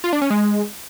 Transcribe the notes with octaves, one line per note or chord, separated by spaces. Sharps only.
F4
D4
C#4
G#3